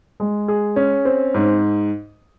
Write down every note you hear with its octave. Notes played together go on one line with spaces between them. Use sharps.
G#3
G#4
C#4
C4
G#2